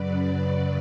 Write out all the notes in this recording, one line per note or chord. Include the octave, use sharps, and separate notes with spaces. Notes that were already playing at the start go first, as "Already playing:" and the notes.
Already playing: F#2 C#3 F#3 B4 D5